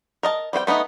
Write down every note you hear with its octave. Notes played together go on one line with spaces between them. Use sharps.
A#4 D#5 A5
G3 C4 C5 G5
A3 B3 C#4 D#4